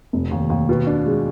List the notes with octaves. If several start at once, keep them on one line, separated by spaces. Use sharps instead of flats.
F1
D#2
D#2
B2
D4
G#3